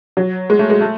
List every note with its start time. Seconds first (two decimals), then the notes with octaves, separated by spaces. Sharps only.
0.17 F#3
0.50 G#3
0.59 A3
0.70 G#3
0.81 A3